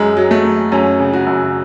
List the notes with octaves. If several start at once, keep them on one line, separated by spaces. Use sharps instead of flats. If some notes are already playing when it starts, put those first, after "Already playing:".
Already playing: F#2 G#3
F#3
A3
F#3
F#2 C#4
C#3
F#4
F#2